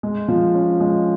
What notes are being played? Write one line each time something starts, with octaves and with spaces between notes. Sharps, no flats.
G#3
F3
C#4
G#3